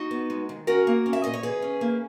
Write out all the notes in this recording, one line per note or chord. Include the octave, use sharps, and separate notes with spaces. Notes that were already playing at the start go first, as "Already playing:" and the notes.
Already playing: D#4 F#4
B3
G#3
D#3
C#4 F#4 A#4
A#3
C#4
E5
A#2 D#5
C#5
E3 G#4 B4
C#4
A#3